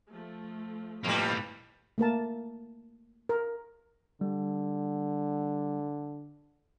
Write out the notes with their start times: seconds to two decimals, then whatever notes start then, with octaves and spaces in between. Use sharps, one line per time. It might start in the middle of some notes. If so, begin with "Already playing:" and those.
0.13 F3 A3
1.04 F2 A2 G3 A#3 B3 B4 B5
1.98 A3 A#3 A#4 A5
3.29 A#4
4.21 D3 G3